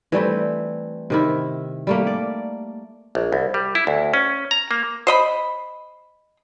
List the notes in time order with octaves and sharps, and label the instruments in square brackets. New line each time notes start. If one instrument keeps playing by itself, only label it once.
[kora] E3 G3 A3 C4
C3 D#3 E4
G3 A3 A#3
D5
[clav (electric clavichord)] A#1
C2
G3
E4
D2
C#4
A#5
A#3
[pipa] C5 D#5 B5